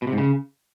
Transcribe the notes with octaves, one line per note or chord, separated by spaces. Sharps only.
B2
C3
G#2
C#3